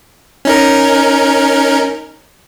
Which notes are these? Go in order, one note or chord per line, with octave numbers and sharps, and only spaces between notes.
C#4 D#4 A#4